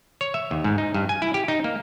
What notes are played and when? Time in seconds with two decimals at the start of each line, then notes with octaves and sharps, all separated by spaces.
0.21 C#5
0.34 E5
0.51 D#2
0.64 G#2
0.78 D#4
0.94 G2
1.09 G#5
1.22 E4
1.34 G4
1.48 D#4
1.64 A#3